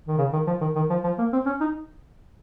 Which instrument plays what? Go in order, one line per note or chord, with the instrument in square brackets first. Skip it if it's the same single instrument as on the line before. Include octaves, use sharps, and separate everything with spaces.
[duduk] D#3
C#3
D#3
F3
D#3
D#3
F3
F3
A#3
C4
C#4
D#4